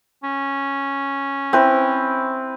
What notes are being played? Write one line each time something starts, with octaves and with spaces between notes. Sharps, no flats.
C#4
C4 E4 B4